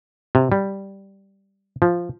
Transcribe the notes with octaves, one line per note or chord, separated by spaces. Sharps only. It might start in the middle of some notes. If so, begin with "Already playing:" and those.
C3
G3
F3